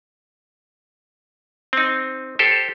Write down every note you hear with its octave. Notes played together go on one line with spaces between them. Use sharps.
C4 D#4
G4 A4 C5